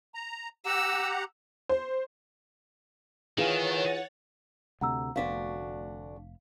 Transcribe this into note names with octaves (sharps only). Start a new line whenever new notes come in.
A#5
G4 F#5 A#5 E6
C5
D#3 E3 D#4 F4 G#4 C#5 F#5 A6
D2 C3 A3 F#5 A#5 E6
F1 D2 B3 D4 F#4 F5 B6